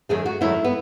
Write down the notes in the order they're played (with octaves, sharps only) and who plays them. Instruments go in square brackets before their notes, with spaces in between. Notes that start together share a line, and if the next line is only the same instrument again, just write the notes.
[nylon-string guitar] F#2 D#3 A3 G#4
F#4
F#2 D#3 A3 E4
B3